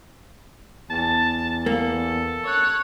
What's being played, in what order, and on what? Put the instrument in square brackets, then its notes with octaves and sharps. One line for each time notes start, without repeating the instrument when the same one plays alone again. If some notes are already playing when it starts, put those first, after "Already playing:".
[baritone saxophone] E2 [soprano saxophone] A5
[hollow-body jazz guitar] A#3 [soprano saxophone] A4
[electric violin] C#5 F#6